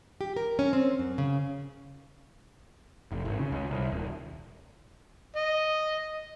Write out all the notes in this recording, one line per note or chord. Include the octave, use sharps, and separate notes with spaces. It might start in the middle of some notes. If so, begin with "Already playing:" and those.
G4
A#4
C#4
C4
F#2
C#3
F1
G#1
C#3
C#2
C2
D#1
D#5